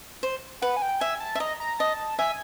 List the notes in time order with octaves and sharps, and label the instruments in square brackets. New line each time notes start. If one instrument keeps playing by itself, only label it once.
[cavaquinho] C5
[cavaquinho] B4 [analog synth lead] F#5
[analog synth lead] G#5
G5
[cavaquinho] E5 [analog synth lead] G#5
[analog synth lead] A5
[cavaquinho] E5
[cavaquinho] D#5 [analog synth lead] A#5
[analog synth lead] A#5
[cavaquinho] D#5 [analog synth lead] A5
[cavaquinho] E5 [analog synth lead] G#5